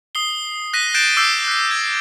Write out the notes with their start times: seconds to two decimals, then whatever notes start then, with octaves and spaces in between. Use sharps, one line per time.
0.15 D#6 C7 G7
0.73 F#6 A#6 B6 D#7
0.94 F#6 G6 A6 C7 D7 E7
1.17 D6 E6 F#6 G6 C7 D#7
1.48 F#6 B6 C7
1.71 G#6